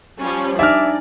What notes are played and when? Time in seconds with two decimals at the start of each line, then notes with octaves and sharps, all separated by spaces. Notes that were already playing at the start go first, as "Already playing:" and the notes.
0.20 F3 G3 C#4
0.59 D4 D#4 D5 E5 G#5 F6